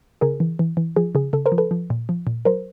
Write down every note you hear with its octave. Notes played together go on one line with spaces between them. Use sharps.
C#3 G#4 A#4
E3
E3
E3
F3 G#4
C#3 G#4
C#3 A4
A#4 C5
F3
A4 B4
F3
A#2
F3
A#2
F#3 A#4 C5